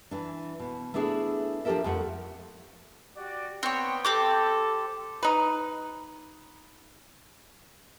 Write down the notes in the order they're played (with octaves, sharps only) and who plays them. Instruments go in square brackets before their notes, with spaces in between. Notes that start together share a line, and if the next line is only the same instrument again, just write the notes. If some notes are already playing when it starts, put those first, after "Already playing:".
[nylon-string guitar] E3 D4
B2
A3 B3 D4 E4 G#4
F3 D4 G4 A4 A#4 E5
F2 F3 A3 F#5
[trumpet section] F#4 G4 D5
[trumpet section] B3 G5 [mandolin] C4 C#5
[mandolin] C4 G4 D6 [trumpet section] A4
[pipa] D#4 B4